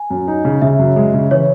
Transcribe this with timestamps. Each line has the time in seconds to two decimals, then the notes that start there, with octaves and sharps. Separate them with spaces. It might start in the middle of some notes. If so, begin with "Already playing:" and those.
Already playing: G#5
0.10 F#2
0.28 D#4
0.45 C#3
0.62 C#3 E5
0.79 F#2
0.96 G#3
1.14 C#3
1.31 E3 C#5